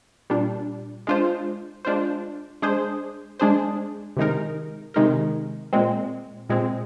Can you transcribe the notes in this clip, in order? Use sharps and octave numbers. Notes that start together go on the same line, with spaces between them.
A#2 G3 D4
G#3 D4 F4 C5
G#3 D4 F4 C5
G#3 D4 G#4 C5
G#3 D4 G#4 C5
C3 D#3 G#3 D#4 A#4
C3 D#3 G#3 D#4 A#4
A#2 G#3 C4
A#2 G#3 C4